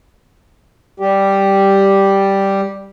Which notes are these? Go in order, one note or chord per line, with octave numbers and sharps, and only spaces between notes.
G3 G4